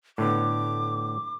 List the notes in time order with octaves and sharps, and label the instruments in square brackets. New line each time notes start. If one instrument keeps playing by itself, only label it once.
[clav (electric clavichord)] A2 D3 B3 [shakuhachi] D6